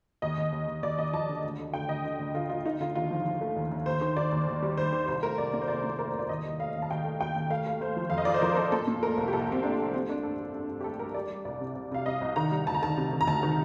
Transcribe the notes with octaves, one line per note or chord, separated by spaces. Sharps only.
D#2 D#5
D#2
D#2
D#2
D#2 D5
D#2 D#5
F3 A5
D3
D2
D3
D3 G5
D2 D#5
D3
D2
D3 F4
D2 F4
D3 D#4
D3 F4
D#2 F4
F3
F3
A3
D#2
D#2
D#2 C5
D#3
D#3 D5
D#2
D#2
G3
D#2 C5
D#3
C2 C5
A3 A#4
C2 D5
A#2 D5
C5
C2 D5
A#2
A3 A#4
C5
C2
D5
D#2 D#5
D#2
A3 F5
D#2
A5
D#2 G5
A3
D#2 G5
D#2
A3 F5
A3
A3 C5
F3
F2 F5
D#5
F3 D5
C5
F3 A#4
A#4
F3 A4
A#2 A4
A#2
A3 A#4
C2
G4
C2 A4
C2 C4
A3 D4
A3
A3 C4
A3 D4
G2 A4
G2
G2
G2
G4
A3 A4
G2 A#4
G3 D5
G3
C2 D5
C3
C2
C3 F5
C3 D#5
C2
D#3 A#5
G3
D2 A5
A#5
D#3 A5
C3
D#3
A#5
D2 A5
D#3